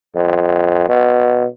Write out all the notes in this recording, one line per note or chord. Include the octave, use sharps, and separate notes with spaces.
F2
B2